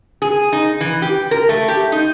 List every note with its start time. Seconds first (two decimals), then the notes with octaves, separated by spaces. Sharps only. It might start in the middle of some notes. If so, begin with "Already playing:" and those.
0.22 G#4
0.53 D#4
0.81 E3
1.02 G4
1.31 A#4
1.49 A3
1.68 G4
1.92 D#4